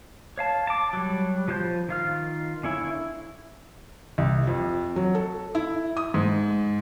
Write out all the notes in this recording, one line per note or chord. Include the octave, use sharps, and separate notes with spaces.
C#5 F5 A5
A5 D6
F#3 G3
F3 F4 C5 G6
D#3 F4 F6
D3 C#4 E4
C2
F2
F#3
A4
E4
D#6
G#2